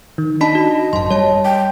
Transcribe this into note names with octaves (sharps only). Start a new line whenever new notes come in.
D#3
D4 D#4 D#5 A5 B5 B6
F#4
G#1 F#2 A5 C6
G3 C#5 A5
G5